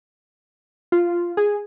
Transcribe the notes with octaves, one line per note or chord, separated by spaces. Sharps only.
F4
G#4